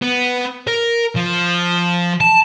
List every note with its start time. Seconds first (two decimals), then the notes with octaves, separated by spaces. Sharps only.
0.02 B3
0.67 A#4
1.16 F3
2.21 A5